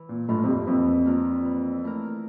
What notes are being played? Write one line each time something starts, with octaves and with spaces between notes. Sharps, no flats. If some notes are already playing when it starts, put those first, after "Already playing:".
Already playing: E3
A#2
A2 A#3 D4 F4
F2
G2
F2 E3
A#3 D4 F4
E3
A3 E4 A#4